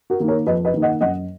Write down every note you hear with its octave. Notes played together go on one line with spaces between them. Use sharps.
F#4 A#4
D#3 A#3
A#4 C#5
F2 B4 D#5
B4 D#5
D#3 A#3
D#5 F#5
F#2 D#5 F#5